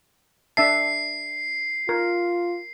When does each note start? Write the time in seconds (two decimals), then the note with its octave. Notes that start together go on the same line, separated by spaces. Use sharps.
0.57 D4 E5 A5 C7
1.89 F4 A#4